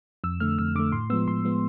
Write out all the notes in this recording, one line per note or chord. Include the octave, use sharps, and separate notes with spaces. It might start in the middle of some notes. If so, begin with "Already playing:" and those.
F2 E6
D3 A3 F6
F2 E6
D3 A3 D6
A2 C6
F3 G#3 B3 E6
A2 C6
F3 G#3 B3